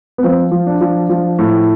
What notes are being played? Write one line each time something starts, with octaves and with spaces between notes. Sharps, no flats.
B3
F3 C4
F3
D4
F3
F3
A2